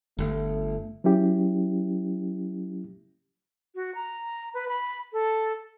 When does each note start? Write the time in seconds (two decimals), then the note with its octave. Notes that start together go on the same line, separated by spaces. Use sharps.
0.19 G1 A3
1.04 F#3 C#4 E4 G4
3.75 F#4
3.95 A#5
4.54 B4
4.69 B5
5.13 A4